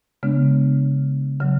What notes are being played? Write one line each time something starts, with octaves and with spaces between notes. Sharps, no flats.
C#3 G#3 B3 D4
C#3 F#3